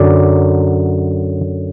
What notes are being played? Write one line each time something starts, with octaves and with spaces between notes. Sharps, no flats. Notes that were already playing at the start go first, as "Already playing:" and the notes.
Already playing: F#2 D3 F#3 D5